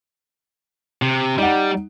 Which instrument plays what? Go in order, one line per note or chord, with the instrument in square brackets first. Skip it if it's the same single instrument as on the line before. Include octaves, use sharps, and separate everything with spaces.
[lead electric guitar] C3
[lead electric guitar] G3 [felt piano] D#4 F#5